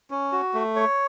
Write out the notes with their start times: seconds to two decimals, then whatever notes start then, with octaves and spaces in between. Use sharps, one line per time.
0.11 C#4
0.32 F#4
0.54 A3
0.76 C#5